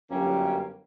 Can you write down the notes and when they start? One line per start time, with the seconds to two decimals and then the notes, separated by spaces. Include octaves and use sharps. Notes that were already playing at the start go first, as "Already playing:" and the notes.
0.11 G1 F#2 G3 A#3 C#4